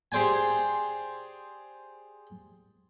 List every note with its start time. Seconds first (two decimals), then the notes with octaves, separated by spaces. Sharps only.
0.12 G4 G#4 C5 D5 G5 G#5